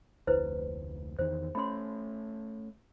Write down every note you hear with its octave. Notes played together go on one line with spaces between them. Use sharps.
F1 D2 E4 B4 C5
E2 D#3 C5
A3 C#4 B5 C6